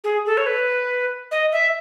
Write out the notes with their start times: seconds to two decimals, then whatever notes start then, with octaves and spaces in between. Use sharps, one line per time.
0.04 G#4
0.26 A4
0.37 C#5
0.46 B4
1.31 D#5
1.52 E5